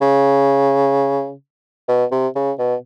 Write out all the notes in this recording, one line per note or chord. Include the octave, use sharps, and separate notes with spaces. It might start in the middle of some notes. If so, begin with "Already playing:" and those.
C#3
B2
C3
C#3
B2